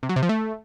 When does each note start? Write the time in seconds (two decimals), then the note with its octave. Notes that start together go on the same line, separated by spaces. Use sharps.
0.03 C3
0.09 F#3
0.16 C3
0.23 F3
0.29 A3